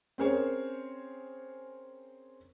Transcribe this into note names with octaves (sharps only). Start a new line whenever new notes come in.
C4 C#4 G#4 A#4 C5 C#5